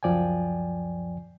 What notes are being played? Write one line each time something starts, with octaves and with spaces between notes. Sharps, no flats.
C#2 F#2 F3 D5 G5 G#5